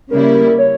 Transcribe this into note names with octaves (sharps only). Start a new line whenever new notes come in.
C#3 G3 A#3 E4 A#4
C#5